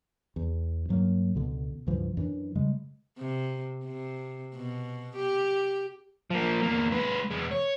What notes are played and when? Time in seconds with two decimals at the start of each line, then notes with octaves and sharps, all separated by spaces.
0.36 E2
0.89 G2 F#3 G3 A#3
1.35 C#2 B2 D3 B3
1.87 C#2 G2 E3 F3
2.17 F#2 E3 D4
2.55 C#3 G3 G#3
3.18 C3
3.85 C3
4.55 B2
5.16 G4
6.30 F3 A#3
6.63 E2 A#3
6.92 G#3 B4
7.30 E2 G#3
7.51 C#5